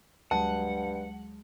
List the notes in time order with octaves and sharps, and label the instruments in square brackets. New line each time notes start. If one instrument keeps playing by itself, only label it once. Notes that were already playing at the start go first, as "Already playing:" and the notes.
[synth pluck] D2 F#3 G#3 [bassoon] G2 [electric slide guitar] F#5 [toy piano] A5